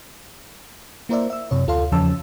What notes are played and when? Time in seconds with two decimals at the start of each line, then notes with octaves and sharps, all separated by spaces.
1.09 A#3 E4 A#4 C5 D5 E5
1.30 E5 E6
1.51 F#2 C3 C#5
1.67 D2 F4 A4 F5 C6
1.92 E2 C#3 F3 C#4 A5 E6